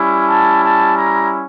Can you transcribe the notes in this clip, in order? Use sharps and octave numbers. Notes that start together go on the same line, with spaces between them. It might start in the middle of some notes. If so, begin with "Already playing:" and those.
Already playing: G3 C#4 E4
A5
A5
A#5